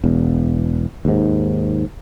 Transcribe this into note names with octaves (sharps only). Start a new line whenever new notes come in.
E1 E2
D#2 G#2